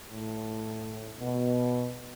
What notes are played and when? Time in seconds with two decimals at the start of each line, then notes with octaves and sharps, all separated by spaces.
0.12 A2
1.20 B2